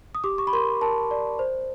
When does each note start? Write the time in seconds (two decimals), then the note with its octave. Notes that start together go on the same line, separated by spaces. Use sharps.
0.15 D#6
0.24 G4 D6
0.38 C#6
0.47 B5
0.53 A#4 C6
0.81 A#4 A5
1.11 D5
1.39 C5